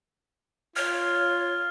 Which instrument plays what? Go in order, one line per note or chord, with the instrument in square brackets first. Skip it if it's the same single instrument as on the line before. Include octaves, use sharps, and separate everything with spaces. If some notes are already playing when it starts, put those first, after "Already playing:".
[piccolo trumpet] F4 [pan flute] C#5 [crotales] F6